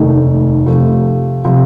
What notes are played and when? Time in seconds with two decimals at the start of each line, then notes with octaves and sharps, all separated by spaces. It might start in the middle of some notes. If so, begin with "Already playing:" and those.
Already playing: F1 D#2 D#3 A3 D#4
0.66 C3 F3 A3
1.45 C3 F3